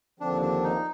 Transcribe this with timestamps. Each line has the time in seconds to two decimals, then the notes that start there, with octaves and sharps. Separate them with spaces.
0.20 D#2 D3 F3 C4 D4
0.42 D4
0.64 D#4